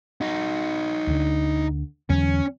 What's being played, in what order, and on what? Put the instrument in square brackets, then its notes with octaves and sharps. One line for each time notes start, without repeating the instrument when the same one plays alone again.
[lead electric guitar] D#4 F#4
[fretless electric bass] D2 D3
[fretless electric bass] E2 D3 F#3 [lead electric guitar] C#4